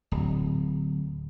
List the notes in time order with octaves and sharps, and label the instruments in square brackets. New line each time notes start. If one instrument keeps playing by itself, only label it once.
[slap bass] D1